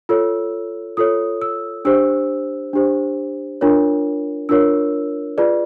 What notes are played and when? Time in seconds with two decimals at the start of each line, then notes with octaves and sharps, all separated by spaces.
0.09 F4 A4 C#5 E6
0.97 F4 A4 C#5 D#6
1.42 E6
1.85 D4 G4 C5 E6
2.73 D4 G4 C5
3.61 D4 F4 A#4 C#5
4.49 D4 F4 A#4 C#5 E6
5.38 F4 G#4 B4 D5